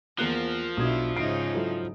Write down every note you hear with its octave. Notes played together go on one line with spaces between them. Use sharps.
E2 F3 A#3 A#4 F#6
B1 D4 E4 D#6 G#6
G#2 C#3 D#4 E5 C7 D7
F#3 E4 A4